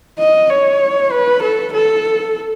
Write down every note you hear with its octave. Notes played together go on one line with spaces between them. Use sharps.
D#5
C#5
B4
A4
A4